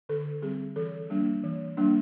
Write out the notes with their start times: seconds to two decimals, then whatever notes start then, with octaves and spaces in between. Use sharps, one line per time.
0.09 D3 A4
0.42 G3 C4 G#4
0.76 E3 A4
1.10 G3 A#3 D4
1.44 E3
1.77 G3 A#3 D4